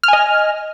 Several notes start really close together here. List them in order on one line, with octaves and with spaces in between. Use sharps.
F6 G#5 D#5